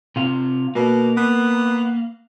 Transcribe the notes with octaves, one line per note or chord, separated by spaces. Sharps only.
C3 F4
B2 A#3
B3